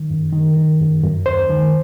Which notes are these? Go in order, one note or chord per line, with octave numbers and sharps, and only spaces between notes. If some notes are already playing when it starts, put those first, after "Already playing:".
Already playing: D#3
F#2
D#3
D#3
F#2
F#2
D#2 C5
D#3